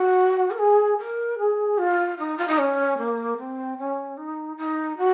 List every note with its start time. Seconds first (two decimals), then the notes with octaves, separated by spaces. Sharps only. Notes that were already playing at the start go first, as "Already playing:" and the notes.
Already playing: F#4
0.50 A#4
0.58 G#4
0.98 A#4
1.38 G#4
1.78 F4
2.18 D#4
2.37 F4
2.47 D#4
2.58 C#4
2.98 A#3
3.38 C4
3.78 C#4
4.17 D#4
4.57 D#4
4.98 F#4